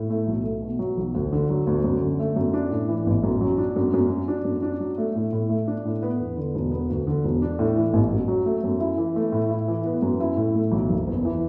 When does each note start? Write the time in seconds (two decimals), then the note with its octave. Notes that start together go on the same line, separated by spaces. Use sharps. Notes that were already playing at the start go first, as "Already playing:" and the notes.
Already playing: A2
0.10 A3
0.27 B1
0.44 A3
0.62 B2
0.79 F#3
0.97 B1
1.15 D2
1.32 D3
1.50 F#3
1.67 D2
1.84 F#2
2.02 D3
2.20 A3
2.36 F#2
2.54 D4
2.71 A2
2.89 E3
3.07 A1
3.23 F#2
3.41 F#3
3.58 D4
3.76 F#2
3.94 F#2
4.10 F#3
4.28 D4
4.45 F#2
4.62 D4
4.80 F#3
4.98 A3
5.15 A2
5.32 A2
5.50 A3
5.68 D4
5.85 A2
6.03 B3
6.19 E2
6.37 D3
6.55 E1
6.71 B3
6.90 D2
7.07 D3
7.24 E1
7.42 D4
7.59 A2
7.77 E3
7.93 A1
8.12 F#2
8.28 F#3
8.46 A3
8.64 F#2
8.80 E4
8.98 E3
9.16 A3
9.32 A2
9.51 E4
9.68 E3
9.86 B3
10.02 F#2
10.20 E4
10.37 A2
10.55 A3
10.72 B1
10.90 F#1
11.08 E2
11.25 E3